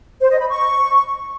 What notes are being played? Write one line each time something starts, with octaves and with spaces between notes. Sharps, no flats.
C5
D#5
B5
C#6